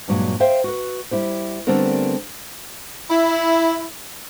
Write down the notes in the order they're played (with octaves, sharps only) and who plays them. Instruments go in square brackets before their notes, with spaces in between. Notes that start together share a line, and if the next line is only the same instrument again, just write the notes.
[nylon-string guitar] G2 A#2 F#3 G#3
C5 E5 F5 G5
F#4 B4
G3 E4 G4 C5
D3 G3 A3 B3 C4 A#4
[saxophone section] E4